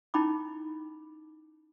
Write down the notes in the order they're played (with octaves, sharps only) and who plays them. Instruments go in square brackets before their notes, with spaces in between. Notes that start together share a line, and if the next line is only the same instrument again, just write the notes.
[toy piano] C#4 D#4 E4 G5 B5 D6